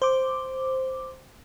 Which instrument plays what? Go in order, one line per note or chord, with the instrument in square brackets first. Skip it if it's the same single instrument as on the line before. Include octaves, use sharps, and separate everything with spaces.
[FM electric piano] C5 D6